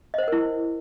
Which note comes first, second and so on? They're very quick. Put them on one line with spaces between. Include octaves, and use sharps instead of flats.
D#5 C5 F#5 A#4 E4